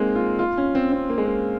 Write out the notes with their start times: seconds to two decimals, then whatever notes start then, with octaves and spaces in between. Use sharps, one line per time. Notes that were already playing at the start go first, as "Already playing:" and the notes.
Already playing: G#3 A#3 C4 D#4
0.15 F4
0.39 F4
0.57 C#4
0.75 C4
0.92 C4
1.10 A#3
1.18 G#3
1.26 A#3